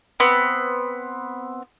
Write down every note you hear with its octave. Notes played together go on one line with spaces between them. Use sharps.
B3 C4